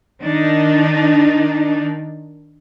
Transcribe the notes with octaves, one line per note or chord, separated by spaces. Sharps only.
D#3 D4 D#4